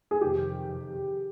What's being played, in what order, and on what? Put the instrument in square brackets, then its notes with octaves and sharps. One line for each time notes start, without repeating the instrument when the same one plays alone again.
[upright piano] G#4
[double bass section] F2 C3 D#3 [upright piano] G4